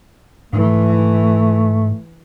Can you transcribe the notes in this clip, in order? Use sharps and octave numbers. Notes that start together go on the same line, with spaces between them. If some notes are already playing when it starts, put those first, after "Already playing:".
G#2 E3 A3